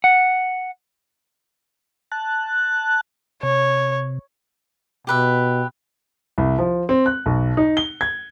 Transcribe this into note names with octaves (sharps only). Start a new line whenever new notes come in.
F#5
A5 F#6
C3 C#5
B2 G4 B4 E5
C2
F3
C4
F#6
B1
D#4
G7
G#6